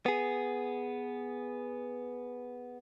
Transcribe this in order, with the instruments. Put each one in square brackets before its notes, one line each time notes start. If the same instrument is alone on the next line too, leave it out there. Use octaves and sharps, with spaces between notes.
[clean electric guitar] B3 G#4